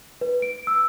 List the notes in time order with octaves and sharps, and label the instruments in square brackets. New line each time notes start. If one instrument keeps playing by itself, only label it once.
[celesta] B4
D7
E6